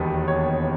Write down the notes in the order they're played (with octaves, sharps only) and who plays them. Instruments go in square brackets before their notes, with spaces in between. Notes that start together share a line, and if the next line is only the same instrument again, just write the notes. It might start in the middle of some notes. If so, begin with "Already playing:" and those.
Already playing: [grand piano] E1 D#2 D#3 B3
C#5